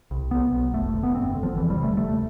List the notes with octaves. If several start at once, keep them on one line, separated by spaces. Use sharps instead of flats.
C2
B1 B3
B1
F1 A3
D3
B3
G1 C4
D3
F3
E1 E3
G3
C3
A3
D2 A3